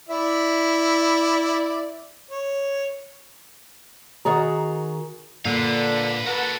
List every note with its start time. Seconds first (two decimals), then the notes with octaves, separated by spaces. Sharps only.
0.09 E4 D5 E5
2.31 C#5
4.25 D#3 F#4 G#4 A#5
5.45 A#2 D3 B4 F5
6.26 A#3 F#4 A4 B4 F#5